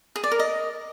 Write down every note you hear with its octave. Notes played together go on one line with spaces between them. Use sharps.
G#4
D5
A#4
D#5